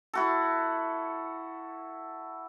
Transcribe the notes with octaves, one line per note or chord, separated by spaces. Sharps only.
E4 F#4 A4